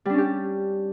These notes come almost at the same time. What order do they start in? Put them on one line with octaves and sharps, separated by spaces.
G3 D4 C#4 G4